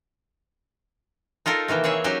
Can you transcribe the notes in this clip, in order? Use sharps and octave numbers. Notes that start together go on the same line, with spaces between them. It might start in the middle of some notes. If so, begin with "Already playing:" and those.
D#4 F4 A4 A#4
C3 D#3 E3 A#3
C4 G#4 C#5 E5
F#3 C#4 D#4 G4 G#5